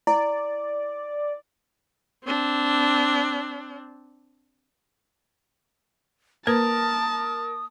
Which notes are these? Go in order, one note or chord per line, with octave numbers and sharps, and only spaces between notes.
E4 D5
C4 D4
A#3 A#4 B4 A5 D#6